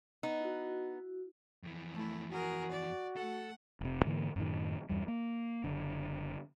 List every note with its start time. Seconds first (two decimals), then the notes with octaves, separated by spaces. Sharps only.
0.23 B3 D#4
0.41 E4 F#4
1.63 F2 E3
1.93 A3 E4
2.31 F#4 G#4 A#4
2.71 D5
3.16 A3 A4 F#5
3.81 F1 C3
4.05 G#2 D3 E3 A#3
4.36 F#2 A2 D#3
4.89 E2 G2 G3
5.08 A#3
5.64 F#1 D3